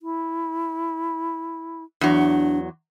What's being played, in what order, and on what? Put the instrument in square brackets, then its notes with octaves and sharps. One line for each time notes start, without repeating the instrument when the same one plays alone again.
[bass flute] E4
[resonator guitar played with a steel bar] E2 F#3 [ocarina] D4